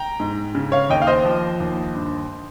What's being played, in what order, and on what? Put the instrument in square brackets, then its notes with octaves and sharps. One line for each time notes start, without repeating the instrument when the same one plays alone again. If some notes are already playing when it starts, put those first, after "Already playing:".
Already playing: [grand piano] G5 A#5
G#2
C#3
C#5 F5
D#2 D#5 G5
F5
C5 D#5
F3
D#2
G2